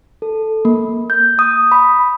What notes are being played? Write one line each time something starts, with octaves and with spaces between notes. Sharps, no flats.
A4
A#3
G6
D#6
B5